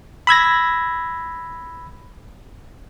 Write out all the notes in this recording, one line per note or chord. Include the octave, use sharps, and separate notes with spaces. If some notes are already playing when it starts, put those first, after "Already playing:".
B5 E6 G#6 A#6